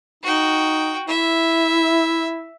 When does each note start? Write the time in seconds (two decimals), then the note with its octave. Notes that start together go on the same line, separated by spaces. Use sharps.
0.23 D#4 F#4 G5
1.08 E4 E5